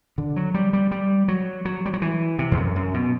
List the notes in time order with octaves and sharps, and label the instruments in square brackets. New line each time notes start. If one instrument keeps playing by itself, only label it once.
[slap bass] D3
F#3
G3
G3
G3
F#3
F#3
G3
F#3
E3
C3
E2
F#2
F#2
B2